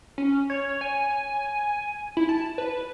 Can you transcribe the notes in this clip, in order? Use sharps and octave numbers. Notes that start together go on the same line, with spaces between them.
C#4
C#5
G#5
E4
A5
B4